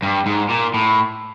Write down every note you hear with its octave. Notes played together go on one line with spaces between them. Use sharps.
G2
G#2
A#2
A2